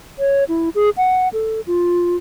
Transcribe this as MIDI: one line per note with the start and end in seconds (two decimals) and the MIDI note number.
0.19 0.44 73
0.49 0.69 64
0.75 0.90 68
0.97 1.28 78
1.33 1.61 69
1.67 2.17 65